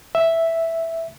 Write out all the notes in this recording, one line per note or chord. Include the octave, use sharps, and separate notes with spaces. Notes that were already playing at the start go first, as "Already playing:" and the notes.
E5